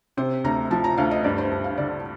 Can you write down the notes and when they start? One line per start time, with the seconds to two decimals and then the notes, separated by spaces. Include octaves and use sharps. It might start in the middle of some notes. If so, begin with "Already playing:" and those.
0.17 C3 C5
0.44 D2 A#5
0.71 F3 A5
0.84 A#5
0.98 D2 F5
1.11 D#5
1.24 G2 D5
1.38 C5
1.52 G2
1.64 F5
1.78 D3 D5